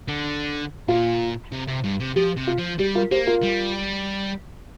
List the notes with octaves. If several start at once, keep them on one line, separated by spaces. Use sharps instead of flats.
D3
A#2 F4
C3
C3
G2
C3
F3 G4
C3
F4
F3
G3 G4
F4 A#4
A#3 G4 C5
F4 A#4
G3